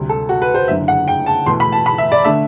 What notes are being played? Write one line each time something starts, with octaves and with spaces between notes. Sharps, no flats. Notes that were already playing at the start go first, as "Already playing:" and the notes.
Already playing: D2 C3 G3
A4
F#4
B4
C5
F#1 F#2 D3 E5
F#5
G5
A5
E2 B2 A3 C6
B5
A5
B5
E5
D5
D3 A3 E5